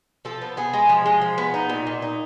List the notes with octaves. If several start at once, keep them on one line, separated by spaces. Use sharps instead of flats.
F3 A4
B3
B3 G#4
G#3
F3
G#3
F3
B3
D#4
A#2
A#2
D#4